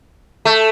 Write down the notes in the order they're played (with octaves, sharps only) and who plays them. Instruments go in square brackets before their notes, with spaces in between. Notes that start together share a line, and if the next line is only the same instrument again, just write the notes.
[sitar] A3